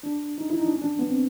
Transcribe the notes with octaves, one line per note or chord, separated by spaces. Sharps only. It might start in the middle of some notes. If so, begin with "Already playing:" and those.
D4
D#4
E4
D#4
D4
C#4
D4
B3
C4